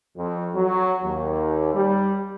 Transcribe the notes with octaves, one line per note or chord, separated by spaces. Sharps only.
F2
F#3
D#2
G3